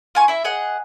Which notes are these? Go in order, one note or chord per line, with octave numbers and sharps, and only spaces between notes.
F4 G#5 C#6
E4 E5
G#4 D#5 F#5